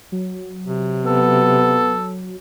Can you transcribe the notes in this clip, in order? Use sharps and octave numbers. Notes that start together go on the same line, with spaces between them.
F#3
C3
B3 A4